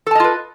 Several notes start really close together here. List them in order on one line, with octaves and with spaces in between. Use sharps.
A4 A5 D#5 F4 B4